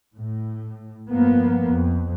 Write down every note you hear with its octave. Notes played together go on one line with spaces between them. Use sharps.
A2
G2 F3 A#3 B3
F2